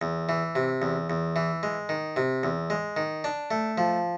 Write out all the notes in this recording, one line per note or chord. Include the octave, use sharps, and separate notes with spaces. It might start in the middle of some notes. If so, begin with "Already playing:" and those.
E2
E3
C3
E2
E2
E3
G#3
D#3
C3
E2
G#3
D#3
D4
A3
F3